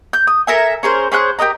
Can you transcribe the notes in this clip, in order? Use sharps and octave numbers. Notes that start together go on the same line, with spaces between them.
G6
D#6
A4 A#4 E5 G#5
C#4 G#4 A#4 C5
C#4 G#4 C5 F#6
G4 A#4 D#5 A#5